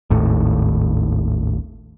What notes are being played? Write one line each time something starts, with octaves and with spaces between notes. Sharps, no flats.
G#1 D#2 A2